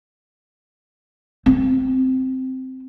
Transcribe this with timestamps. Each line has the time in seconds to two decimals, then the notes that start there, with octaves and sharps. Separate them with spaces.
1.46 C4